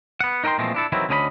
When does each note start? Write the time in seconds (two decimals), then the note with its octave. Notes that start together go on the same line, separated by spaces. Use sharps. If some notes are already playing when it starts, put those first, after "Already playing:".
0.21 B3 F#5
0.44 D#4 A#4 D#5 G5 C6
0.58 A#2 E3 F3 G#3 A3 C4
0.74 D4 E4 A4
0.92 D#3 E3 F#3 C4 E4
1.09 D2 D3 C#4 D#5 G5 B5